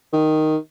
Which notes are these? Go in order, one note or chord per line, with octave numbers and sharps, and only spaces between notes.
D#3